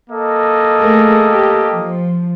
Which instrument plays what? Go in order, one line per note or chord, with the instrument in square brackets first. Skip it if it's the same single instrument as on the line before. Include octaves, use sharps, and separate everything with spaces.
[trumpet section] A#3 A4 D#5
[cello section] A3 G#4 A#4
G4
F3